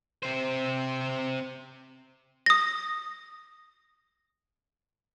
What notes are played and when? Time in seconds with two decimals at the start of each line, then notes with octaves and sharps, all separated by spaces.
0.23 C3 C5
2.46 D#6 A#6